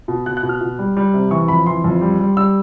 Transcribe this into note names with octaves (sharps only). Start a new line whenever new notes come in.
B2
B2 F#6
F#6
B2
F6
B2
G3
G3
C3
E3 C#6
F2 B5
E3 C6
F2
G3
G3
G3 E6